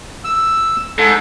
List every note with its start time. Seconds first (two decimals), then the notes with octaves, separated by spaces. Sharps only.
0.24 E6
0.98 G#2 A4